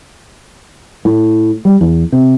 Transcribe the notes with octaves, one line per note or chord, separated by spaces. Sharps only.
A2
G3
E2
C3